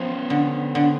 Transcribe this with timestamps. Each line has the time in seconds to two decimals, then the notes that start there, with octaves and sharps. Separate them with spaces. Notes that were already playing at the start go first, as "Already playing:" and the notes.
Already playing: F3 B3 C#4
0.30 D3
0.75 D3